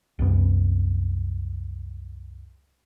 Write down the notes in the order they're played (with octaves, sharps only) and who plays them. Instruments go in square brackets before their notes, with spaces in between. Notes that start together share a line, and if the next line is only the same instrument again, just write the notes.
[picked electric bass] C2 F#2 B3